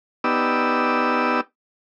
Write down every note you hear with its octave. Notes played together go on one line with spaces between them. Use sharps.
B3 D#4 G4 D5 E6